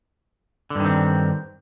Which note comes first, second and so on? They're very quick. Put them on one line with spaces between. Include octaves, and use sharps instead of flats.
D3 G2 D#3 C4